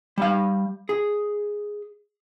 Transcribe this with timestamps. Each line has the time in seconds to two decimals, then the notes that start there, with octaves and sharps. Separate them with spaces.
0.18 G3 F5
0.89 G#4